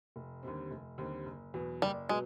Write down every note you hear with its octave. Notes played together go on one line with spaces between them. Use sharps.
F1
D#2 D3 G3 C4
F1
D#2 D3 G3 C4
F#1
E2 B2 F#3 B3
F#1 G3
B2 F#3 G#3 B3